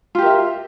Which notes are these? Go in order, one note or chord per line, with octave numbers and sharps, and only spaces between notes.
F4 G4 A#4 E5